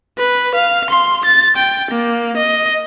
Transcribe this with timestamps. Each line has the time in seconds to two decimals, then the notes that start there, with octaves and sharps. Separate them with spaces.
0.18 B4
0.55 F5
0.90 C6
1.25 A6
1.56 G5
1.91 A#3
2.37 D#5